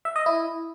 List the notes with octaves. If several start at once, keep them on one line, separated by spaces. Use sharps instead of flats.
E5
D#5
E4